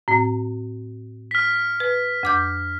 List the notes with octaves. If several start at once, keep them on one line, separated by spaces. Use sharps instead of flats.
A2 C4
F6 B6
B4
F2 D6 G6